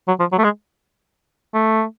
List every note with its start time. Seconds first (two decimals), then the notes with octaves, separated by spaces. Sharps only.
0.08 F#3
0.20 F3
0.32 F#3
0.38 A3
0.44 G#3
1.54 A3